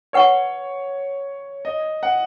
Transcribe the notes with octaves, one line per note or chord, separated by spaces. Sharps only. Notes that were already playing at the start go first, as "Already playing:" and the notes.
B4 C#5 F#5 C#6
D#5
F#5